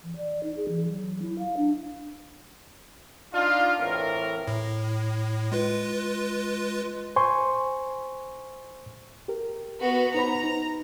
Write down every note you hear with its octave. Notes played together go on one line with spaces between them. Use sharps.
E3
D5
D#4
G#4
E3
F#3
E4
F5
D4
D4 D#4 F4
A2 E3 C4 A#4
A2
G#3 F4 B4
C5 G#5 C6 C#6
G4 A#4
B3 F#4
D#4 C5 A#5 B5
D#4